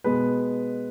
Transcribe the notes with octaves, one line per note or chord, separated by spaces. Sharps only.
B2 G#3 B3 B4